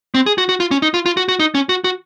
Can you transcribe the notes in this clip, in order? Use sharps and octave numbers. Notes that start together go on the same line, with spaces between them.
C4
G#4
F#4
F#4
F4
C#4
D#4
F4
F4
F#4
F#4
D#4
C#4
F#4
F#4